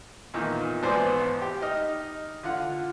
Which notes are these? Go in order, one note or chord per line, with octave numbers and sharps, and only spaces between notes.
E2 A#2 D#3
G#1 E2 B3 C5 D5 G#5
G4
D#4 D#5 F6
D3 F4 F#5